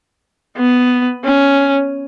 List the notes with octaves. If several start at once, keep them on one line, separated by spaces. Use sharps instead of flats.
B3
C#4